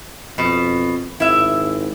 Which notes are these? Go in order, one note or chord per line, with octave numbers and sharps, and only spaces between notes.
F2 B2
G#1 E4 E5